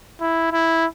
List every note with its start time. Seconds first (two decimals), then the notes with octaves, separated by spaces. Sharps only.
0.21 E4
0.52 E4